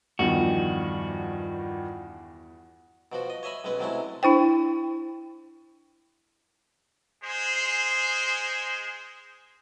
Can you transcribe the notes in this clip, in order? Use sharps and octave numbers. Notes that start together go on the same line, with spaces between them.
E2 G2 D#3 F3 F#4
B2 F3 F#4
D#5
C#5 D#5 E5 G#5 B5
B1 G#3 C#4 B4
C3 F#3 G#3 A3 C#4 E4
D4 E4 C5 G5
G#3 G#4 C5